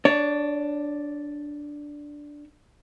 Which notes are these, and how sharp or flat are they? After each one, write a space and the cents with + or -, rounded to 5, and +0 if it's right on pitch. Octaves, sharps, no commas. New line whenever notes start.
D4 +0 C#5 +25